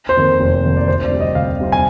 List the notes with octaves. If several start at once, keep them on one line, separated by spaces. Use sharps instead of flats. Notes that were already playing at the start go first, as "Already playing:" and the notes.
C5
F2 D#3 A#3
F1
F2 D#3 A#3
D5
D2 C5
D5
C3 G3 C4
D#5
D2 F5
C3 G3 C4
G#5